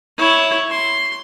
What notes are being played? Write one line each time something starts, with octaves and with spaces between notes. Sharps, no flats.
E4 C#5
C6